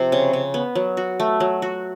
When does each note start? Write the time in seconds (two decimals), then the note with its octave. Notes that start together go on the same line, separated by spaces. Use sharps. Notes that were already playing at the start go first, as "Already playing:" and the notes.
Already playing: C3 F3
0.12 C#3
0.33 C#3
0.54 B3
0.75 F#3
0.97 F#4
1.20 A3
1.40 F#3
1.62 F#4